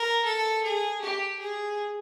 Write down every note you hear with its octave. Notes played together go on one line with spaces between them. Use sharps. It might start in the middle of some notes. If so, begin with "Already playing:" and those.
Already playing: A#4
A4
G#4
G4
G#4